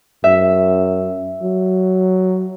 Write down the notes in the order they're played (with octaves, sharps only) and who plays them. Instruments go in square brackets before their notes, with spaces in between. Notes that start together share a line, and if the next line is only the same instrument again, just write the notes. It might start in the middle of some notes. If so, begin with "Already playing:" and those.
[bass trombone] F#2 [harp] E5
[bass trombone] F#3